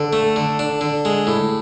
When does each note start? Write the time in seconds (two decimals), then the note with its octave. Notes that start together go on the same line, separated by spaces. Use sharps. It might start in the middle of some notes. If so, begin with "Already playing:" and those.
Already playing: D3
0.13 A3
0.36 D3
0.59 D4
0.81 D3
1.05 G#3
1.27 A2